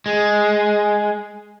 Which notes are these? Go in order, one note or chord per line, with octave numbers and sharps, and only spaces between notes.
G#3